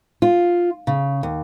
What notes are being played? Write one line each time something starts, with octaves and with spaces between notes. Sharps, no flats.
F4
C#3
D#2